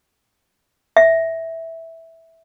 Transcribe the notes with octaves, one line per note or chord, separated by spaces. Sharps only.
E5